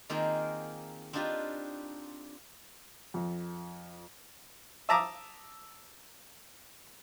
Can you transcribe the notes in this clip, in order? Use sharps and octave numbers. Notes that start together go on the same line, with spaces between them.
D#3 A#3 C4 F4 G#4 A#4
C4 D4 D#4 F4 G4 B4
F2
E5 A5 A#5 D6 D#6